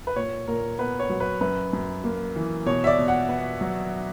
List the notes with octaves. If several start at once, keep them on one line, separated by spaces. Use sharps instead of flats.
B4
A#2 C#5
A#2 A#4
B3 B4
C#5
F#3
B4
F#2 B4
F#2
A#3
E3
B2 C#5
E5
D5
B2
F#5
B3
F#3